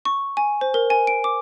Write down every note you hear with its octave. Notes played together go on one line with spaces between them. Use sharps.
C#6
G#5
C5
A#4
G#5
D7
D6